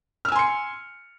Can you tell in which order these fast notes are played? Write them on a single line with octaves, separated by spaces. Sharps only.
F6 E6 G#5 C6 C#7